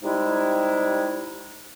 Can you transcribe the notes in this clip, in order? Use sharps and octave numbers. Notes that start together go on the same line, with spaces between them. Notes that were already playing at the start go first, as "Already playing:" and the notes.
C3 G3 G#3 D#4 E4